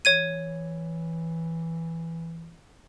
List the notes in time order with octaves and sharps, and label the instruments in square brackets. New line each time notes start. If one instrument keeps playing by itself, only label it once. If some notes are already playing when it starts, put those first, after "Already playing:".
[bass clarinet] E3 [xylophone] C#5 G#6 D#7